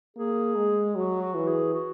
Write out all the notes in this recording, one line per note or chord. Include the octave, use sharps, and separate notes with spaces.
A#3 G#4
G#3
F#3 F#4
F#4
E3
G#4
F#4